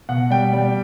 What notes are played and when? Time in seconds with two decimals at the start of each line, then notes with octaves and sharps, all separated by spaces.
0.09 B2 F#5
0.30 G3 G5
0.53 G3